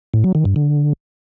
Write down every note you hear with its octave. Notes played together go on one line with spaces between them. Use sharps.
A2
F#3
D#3
G2
D3